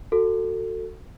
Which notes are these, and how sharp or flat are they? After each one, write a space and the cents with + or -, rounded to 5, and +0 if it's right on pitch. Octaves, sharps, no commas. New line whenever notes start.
F#4 +0 A4 +20